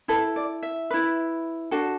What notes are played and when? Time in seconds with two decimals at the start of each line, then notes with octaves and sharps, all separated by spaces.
0.08 E4 A4 B4
0.36 D5
0.63 E5
0.91 E4 B4
1.71 D4 F#4 A4